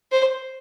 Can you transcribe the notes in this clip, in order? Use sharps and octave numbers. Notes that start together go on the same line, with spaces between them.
C5